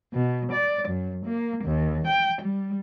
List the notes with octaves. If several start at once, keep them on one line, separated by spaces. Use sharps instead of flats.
B2
D5
F#2
A#3
D#2
G5
G3